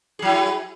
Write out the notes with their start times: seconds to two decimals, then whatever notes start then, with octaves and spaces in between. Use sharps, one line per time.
0.19 G#4
0.22 F#3
0.25 E4